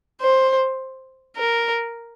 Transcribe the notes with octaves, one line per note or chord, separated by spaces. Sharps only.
C5
A#4